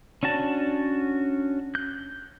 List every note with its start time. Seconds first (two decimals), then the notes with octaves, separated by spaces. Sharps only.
0.23 C#4 D4 F#4 A5
1.75 F#6 G6